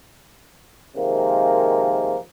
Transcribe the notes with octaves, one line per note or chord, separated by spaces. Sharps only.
C3 D#3 F3 G#3 A#3